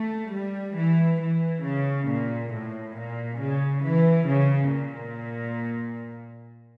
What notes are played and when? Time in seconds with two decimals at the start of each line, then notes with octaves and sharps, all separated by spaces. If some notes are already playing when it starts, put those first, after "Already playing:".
Already playing: A3
0.31 G3
0.75 E3
1.20 E3
1.63 C#3
2.08 A#2
2.52 A2
2.96 A#2
3.40 C#3
3.83 E3
4.28 C#3
4.71 A#2